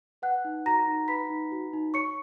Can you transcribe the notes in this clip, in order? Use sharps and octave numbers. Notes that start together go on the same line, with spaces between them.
B4 F#5 F#6
D#4
F#4 A#5 A#6
D#4
B4 B5 B6
D#4
F#4
D#4
C#5 C#6 C#7